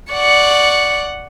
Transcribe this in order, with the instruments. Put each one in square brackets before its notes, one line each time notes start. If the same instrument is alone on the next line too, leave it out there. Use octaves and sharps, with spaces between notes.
[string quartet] D5 F#5 C#6